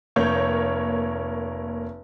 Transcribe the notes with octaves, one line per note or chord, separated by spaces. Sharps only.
F1 A#3 C#5 G6